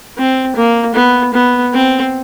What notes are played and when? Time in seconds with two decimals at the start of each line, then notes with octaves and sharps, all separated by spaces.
0.18 C4
0.56 A#3
0.95 B3
1.33 B3
1.73 C4